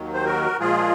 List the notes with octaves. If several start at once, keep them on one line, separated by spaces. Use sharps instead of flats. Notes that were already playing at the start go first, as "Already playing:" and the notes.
Already playing: D#2 D#3 F#3
C5
F#4 A#4
A#2 F3 G#3 F4 G#4